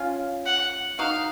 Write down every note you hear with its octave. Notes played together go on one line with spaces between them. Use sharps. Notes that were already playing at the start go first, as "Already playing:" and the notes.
Already playing: C#4 F4
F#5
D#4 F#4 F5